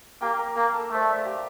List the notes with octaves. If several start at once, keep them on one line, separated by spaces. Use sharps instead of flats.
A#3 G4 G5
A#4 A#5
A#3 A#4 A#5
A4 A5
A3 C5
D5
E5
F5
G4 G5